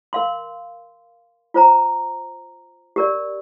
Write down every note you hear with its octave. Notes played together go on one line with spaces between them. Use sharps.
A#4 F5 C6
F4 C5 A#5
G4 A#4 D5